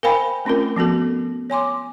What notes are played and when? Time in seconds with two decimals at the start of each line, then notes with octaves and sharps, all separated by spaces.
0.03 A#4 C5 F5 G5 G#5 B5
0.45 A3 C4 C#4 F4 A#4
0.76 F3 B3 F#4 A4
1.50 C#5 G#5 C6 D6